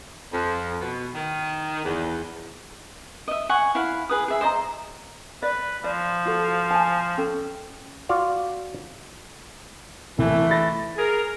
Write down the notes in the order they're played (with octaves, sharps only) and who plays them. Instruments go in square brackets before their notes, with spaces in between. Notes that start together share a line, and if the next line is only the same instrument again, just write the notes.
[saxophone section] F2
B2
D#3
E2
[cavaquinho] D#5 E5
F#5 G#5 C#6
E4 F5 F#5
G#4 B4 D#6
G#4 E5
C5 D#5 G#5 A#5
[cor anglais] B4 [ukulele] D5
[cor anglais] F3 [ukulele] D5
[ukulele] F4 F#4 A4
G#5 A5
C#4 A4 G5
[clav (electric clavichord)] F4 F#4 D5 F5
[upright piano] C2 E5 [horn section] E3 A3
[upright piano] B5 A6 A#6
[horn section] G#4 A#4